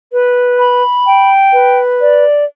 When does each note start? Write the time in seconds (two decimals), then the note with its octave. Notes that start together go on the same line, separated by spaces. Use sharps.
0.11 B4
0.58 B5
1.06 G5
1.53 B4
2.00 D5